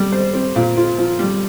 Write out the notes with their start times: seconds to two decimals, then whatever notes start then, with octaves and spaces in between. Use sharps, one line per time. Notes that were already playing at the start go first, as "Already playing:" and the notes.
Already playing: G3
0.12 C5
0.34 C4
0.56 A#2
0.77 F4
0.98 F3
1.19 G3